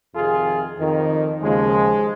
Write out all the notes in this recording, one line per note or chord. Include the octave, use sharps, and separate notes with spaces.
F2 C3 D#3 F4 G#4
F2 D#3
D#2 C#3 F3 G#3